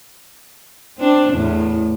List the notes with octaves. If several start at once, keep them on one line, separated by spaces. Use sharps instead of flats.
C4 D4
E2 A2